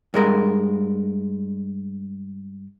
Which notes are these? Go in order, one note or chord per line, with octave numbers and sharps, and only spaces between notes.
G2 G#3 A#4